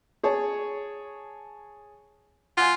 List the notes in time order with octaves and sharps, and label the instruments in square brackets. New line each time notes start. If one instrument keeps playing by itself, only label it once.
[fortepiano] G#4 C#5 A5
[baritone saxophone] F4 [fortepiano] F#5 G#5